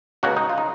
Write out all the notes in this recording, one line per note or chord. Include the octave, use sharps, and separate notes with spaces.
C#2 B2 A#3 F#4
D#4
F4
D#4